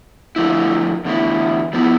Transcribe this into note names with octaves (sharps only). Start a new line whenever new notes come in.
F2 D3 F3 A3 E4
E2 D3 A3 E4
F3 B3 E4